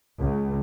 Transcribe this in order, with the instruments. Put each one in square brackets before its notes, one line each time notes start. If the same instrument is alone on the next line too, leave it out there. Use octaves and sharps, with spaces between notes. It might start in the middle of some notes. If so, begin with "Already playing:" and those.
[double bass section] C#2